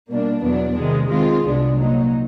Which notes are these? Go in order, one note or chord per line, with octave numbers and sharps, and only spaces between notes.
B2 G3 A#3 D4
E2 B2 F#3 B3 D4
C3 D#3 G#3
D#3 G#3 C4 F4
C2 B2 G#3 B3 D4
A#2 F#3 A#3 D#4